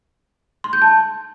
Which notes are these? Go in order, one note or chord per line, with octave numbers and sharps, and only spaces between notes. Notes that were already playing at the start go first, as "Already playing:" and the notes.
C6
G6
A5